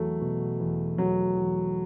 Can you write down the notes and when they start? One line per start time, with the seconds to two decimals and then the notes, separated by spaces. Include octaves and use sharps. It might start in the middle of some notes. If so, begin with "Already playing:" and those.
Already playing: E2 F#3 A3
0.21 B2
0.60 E2
0.98 E2 F#3
1.36 E2